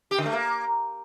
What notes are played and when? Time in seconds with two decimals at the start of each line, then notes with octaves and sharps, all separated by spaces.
0.11 G4
0.18 D3
0.26 A3
0.33 A#3